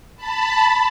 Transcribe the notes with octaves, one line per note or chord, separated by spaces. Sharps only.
A5 B5